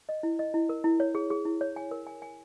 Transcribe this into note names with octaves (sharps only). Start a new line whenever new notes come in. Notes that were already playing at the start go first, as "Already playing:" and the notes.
D#5
E4
D#5
E4
A#4
E4
C#5
G#4
G#4
E4
C#5
G#5
A#4
G#5
G#5